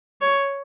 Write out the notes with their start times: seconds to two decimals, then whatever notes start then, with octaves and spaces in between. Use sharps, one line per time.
0.21 C#5